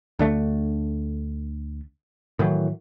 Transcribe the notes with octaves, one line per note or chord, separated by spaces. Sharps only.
D2 D3 A3
A2 D#3 E3 F#3